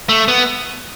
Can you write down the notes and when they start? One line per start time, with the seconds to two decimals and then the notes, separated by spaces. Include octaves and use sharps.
0.09 A3
0.28 B3